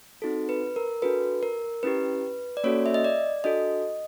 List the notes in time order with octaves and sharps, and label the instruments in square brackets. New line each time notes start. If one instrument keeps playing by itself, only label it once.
[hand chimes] C4 D#4 F#4 A4
B4
A#4
D4 F#4 A4 B4
A#4
C#4 E4 G4 B4
D5
A#3 C#4 F#4 A4 C#5
E5
D#5
D5
D4 F#4 A4 D#5